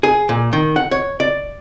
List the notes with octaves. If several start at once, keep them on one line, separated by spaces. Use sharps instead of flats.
G#4
A#2
D#3
F#5
C#5
D5